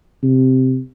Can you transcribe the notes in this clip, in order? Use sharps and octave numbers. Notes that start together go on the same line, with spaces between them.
C3